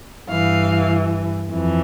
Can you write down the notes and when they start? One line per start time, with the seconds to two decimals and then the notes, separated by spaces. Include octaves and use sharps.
0.30 G2 E3 F5
1.52 F2 E3